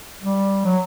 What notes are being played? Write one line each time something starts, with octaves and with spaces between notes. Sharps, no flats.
G3
F#3